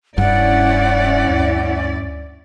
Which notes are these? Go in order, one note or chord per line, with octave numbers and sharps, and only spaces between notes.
E1 G2 C#4 E4 D5 F#5
D2